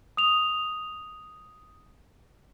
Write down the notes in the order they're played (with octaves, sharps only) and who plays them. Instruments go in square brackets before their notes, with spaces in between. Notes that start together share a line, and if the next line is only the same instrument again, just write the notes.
[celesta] D#6 F7